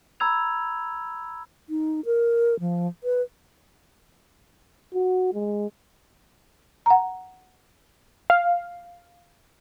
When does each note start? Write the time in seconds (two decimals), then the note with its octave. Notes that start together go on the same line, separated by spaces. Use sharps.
0.20 A#5 B5 E6 G#6 F7
1.69 D#4
2.05 A#4
2.60 F3
3.04 B4
4.94 F#4
5.34 G#3
6.86 F#5 A#5
8.30 F5